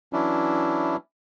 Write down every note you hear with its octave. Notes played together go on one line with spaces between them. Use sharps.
E3 F#3 C#4 D4 E4